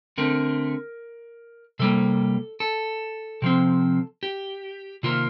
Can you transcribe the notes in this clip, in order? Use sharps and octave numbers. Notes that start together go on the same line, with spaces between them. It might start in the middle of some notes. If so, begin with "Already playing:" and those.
D3 A3 C4 A#4
C3 G3 A#3 A4
A4
C3 F3 C4
G4
C3 D#3 A#3 F4